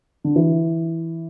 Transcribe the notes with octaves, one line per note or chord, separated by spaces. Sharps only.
D3
E3